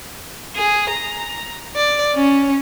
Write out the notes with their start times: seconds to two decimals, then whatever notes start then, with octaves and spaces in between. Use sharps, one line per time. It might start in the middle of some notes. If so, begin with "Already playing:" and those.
0.56 G#4
0.89 A#5
1.76 D5
2.15 C#4